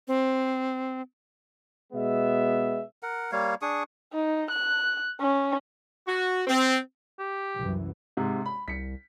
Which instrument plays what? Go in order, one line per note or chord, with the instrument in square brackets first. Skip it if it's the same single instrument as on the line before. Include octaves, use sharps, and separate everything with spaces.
[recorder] C4
[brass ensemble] B2 G#3 B3 E5
[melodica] A#4 F#5
G3 A#3 C#5 F5
D4 G#4 C#6 D#6
[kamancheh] D#4
F#6
C#4
[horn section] F#4
C4
[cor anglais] G4
[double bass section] C2 F#2 E3
[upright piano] G#2 C3
B5
[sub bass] C2 [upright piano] B6 C#7